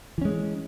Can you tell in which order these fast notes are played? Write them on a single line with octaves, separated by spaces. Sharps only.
E3 C#4 G#3